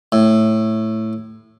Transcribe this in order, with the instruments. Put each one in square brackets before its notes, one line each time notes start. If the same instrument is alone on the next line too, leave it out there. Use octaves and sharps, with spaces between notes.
[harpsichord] A2